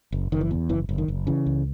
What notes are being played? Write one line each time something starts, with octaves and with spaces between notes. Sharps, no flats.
F#1
F#1 D#3
E3
E2
F#1 E3
F#1
D#3
F#1
C#3 E3
C#2